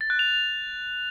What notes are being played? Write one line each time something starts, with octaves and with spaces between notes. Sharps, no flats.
A6
F#6
F7